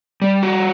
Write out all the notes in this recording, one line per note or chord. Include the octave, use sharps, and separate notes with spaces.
G3
F#4